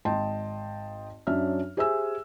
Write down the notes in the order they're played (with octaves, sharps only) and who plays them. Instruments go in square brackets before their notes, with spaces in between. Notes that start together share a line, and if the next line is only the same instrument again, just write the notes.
[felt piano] G#1 D#5 G5 A5 C6
F#2 F#3 C#4 D4 E5 F6
G4 G#4 C5 E5 G#5 E6